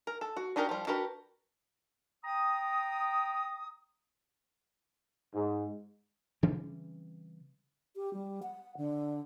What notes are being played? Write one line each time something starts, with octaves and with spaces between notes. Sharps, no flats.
A#4
A4
F#4
D4 D#4 F#4 G4 A#4
F3 G3
D4 F#4 G4 A#4 B4
G5 A#5 D#6
G#2
C#3 E3 G3 C4
G4
G3
F#5
D3